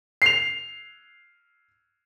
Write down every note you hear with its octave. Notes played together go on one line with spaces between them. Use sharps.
C7 F7